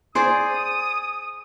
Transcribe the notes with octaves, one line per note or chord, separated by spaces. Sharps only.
G#4 C5 D5 D#6